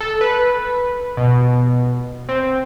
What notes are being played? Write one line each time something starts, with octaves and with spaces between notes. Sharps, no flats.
A4
B4
B2
C4